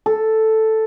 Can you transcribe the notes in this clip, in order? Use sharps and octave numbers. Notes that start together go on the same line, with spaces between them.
A4